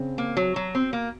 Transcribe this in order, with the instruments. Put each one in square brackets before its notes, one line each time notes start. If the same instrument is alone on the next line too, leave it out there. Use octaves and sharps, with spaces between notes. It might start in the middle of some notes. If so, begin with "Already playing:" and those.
Already playing: [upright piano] C#3 C4
[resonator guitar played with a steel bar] A#3
F#3
F#3
C4
A#3